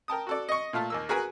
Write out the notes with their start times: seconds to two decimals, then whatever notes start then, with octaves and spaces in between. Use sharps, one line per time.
0.08 A#4 G5 A5 D#6
0.27 F#4 A4 D5
0.49 D#5 C#6
0.73 A#2 A3 F4 A5
0.90 D#2 A#3 E6
1.09 F#4 G#4 A#4 B4 G#5 B5